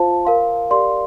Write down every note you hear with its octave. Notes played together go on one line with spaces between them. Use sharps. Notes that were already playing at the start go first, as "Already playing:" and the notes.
Already playing: F4 C5 F5 A5
A#4 F5 C6
G4 A#4 D5 F5 C6